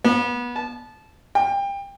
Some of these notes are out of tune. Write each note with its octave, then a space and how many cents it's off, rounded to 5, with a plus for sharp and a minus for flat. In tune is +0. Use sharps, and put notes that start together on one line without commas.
B3 -25
A5 -20
G5 +25